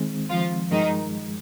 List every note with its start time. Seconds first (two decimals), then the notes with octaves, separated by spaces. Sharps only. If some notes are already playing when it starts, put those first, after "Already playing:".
Already playing: D#3 G#3 C4
0.30 F3 F4
0.71 G2 D#3 F3 G#3 D#4